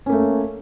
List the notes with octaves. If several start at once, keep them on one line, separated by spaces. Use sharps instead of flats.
A3 A#3 C#4